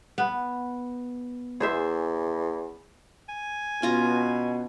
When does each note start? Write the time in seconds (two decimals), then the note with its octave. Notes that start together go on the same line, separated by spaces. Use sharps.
0.18 B3
1.60 E2 G#4 C5 E5
3.29 G#5
3.82 B2 C#4 F4 A#5